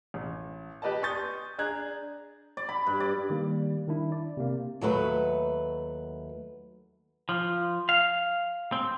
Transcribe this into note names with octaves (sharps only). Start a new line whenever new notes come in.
A1
G4 B4 D5 D#5 A5
C6 C#6 D#6 G6 A6
D4 G#4 A#5 F#6 G#6
D5
B5
G2
D5
D#3 G3 A#3
D#3 D4 E4
D5
C3 A#3
D#2 F#3 A3 B4
F3
F5
C4